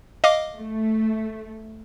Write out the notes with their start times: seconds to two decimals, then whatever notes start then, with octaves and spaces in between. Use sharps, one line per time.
0.24 D#5 F5 D6
0.55 A3